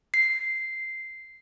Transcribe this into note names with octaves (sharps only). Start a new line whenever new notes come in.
C7